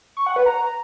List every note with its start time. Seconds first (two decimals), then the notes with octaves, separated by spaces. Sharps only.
0.17 C#6
0.26 F#5
0.36 B4
0.46 A#5